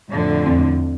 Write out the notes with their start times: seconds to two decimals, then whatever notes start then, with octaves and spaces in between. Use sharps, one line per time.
0.10 F2 A2 D3
0.46 E2 C4